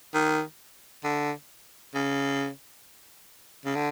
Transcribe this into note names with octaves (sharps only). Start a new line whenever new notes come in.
D#3
D3
C#3
C#3
D3